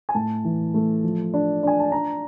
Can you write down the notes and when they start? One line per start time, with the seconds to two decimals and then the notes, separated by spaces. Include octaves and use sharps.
0.09 G#5
0.15 A2 A5
0.45 E3
0.74 A3
1.03 F3
1.34 D4
1.63 D4 G#5
1.80 A5
1.92 D4 A#5